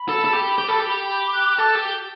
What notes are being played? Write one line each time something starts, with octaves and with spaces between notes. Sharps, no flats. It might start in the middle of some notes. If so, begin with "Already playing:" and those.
Already playing: B5
A4
A4
G4
G4
A4
G4
B5
F#6
A4
G4